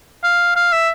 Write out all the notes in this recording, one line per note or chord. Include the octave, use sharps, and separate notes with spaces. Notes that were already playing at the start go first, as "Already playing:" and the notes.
F5
F5
E5